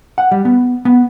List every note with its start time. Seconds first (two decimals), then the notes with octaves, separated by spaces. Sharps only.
0.18 F#5
0.31 G3
0.45 B3
0.85 B3